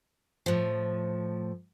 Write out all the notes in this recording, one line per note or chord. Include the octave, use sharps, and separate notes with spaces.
A2 F3